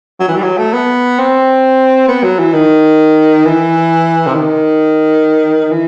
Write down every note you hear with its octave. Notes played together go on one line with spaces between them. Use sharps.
F#3
E3
G3
F#3
A3
B3
C4
B3
F#3
E3
D#3
E3
C3
D#3
E3